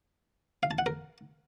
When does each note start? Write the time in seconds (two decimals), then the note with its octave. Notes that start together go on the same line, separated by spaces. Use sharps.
0.63 F5
0.71 A5
0.78 F#5
0.86 A#4